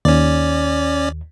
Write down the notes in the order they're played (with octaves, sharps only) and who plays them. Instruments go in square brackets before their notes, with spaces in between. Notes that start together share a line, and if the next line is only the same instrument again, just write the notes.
[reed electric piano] D#2 [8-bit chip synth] C#4 D5